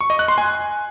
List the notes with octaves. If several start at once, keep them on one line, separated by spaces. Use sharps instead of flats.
C#6
D#5
F#6
C6
G#5